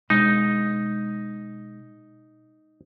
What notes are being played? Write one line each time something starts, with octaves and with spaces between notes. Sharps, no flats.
B2 G#3 D#4 D#5